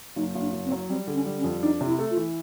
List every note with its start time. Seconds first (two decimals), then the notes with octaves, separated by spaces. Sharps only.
0.16 F#1 D#4
0.35 F#1
0.41 D4
0.53 F#1
0.65 C4
0.72 F#3
0.89 G3 C4
1.07 D3
1.14 C#4
1.26 G3
1.38 C#4
1.44 F2
1.63 D4 D#4
1.81 C3
1.87 E4
1.99 A3
2.11 F4
2.17 E3